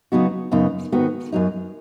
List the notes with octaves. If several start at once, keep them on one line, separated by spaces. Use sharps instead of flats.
C#3 F#3 B3 D#4 F#4
F#2 C#3 F#3 B3 D#4
G#2 D#3 B3 F#4
F#2 F#3 D#4